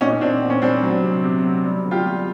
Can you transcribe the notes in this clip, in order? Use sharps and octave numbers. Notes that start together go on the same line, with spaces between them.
A#2 C#4 D#4
A#2 C4 D4
A#2
C#4
G3 C4 D4
F#3
C3
C3
F#3
G3
D3
F4 G4
G3